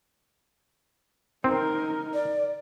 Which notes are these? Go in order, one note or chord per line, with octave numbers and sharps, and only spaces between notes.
C4 D#4 A#4
D5